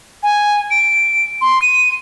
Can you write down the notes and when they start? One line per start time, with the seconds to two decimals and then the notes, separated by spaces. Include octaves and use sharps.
0.23 G#5
0.71 D7
1.41 C6
1.62 D#7